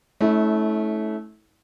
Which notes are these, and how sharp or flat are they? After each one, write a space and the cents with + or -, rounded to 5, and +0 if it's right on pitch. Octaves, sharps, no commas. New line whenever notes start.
A3 -20 C#4 +0 E4 -40